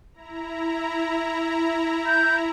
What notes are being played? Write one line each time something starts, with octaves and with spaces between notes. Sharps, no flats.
E4 A#5
G6